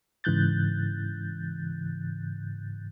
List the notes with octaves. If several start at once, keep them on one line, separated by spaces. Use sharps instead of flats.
G#2 C#3 E3 F#6 G6 A6